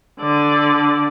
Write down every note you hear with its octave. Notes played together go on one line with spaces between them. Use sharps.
D3 D5